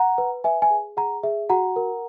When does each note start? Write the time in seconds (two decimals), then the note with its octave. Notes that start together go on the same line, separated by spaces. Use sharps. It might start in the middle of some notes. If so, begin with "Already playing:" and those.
Already playing: F#5 A#5
0.18 B4
0.44 B4 E5 G#5
0.62 E5 G#5
0.71 G#4
0.97 G#4 F#5 A#5
1.23 G#4 E5
1.49 F#4 F#5 A#5
1.76 A#4